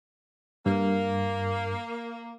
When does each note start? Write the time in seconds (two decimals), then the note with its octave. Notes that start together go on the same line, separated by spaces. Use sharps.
0.66 G2 A#3